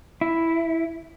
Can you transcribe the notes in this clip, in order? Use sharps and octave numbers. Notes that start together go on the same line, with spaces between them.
E4